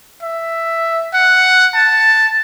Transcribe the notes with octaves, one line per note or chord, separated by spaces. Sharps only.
E5
F#5
A5